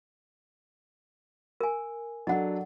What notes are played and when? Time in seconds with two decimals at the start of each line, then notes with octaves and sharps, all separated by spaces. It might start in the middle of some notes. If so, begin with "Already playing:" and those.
1.61 A#4 G#5
2.27 F#3 D4 A4 D#5 F#5